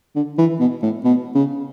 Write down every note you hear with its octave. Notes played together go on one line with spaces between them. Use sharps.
D3
E3
B2
A2
B2
C#3